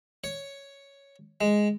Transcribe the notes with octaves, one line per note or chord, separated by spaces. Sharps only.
C#5
G#3